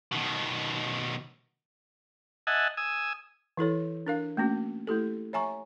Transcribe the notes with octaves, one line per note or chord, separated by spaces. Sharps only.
B2 D#3
D#5 E5 F#5 G#5 A5
G#5 D#6 E6
E3 E4 A4 C#5
D4 A#4 F5
A3 A#3 C#4 F#4
A3 E4 G4 A4
C#5 E5 G#5 A#5 C#6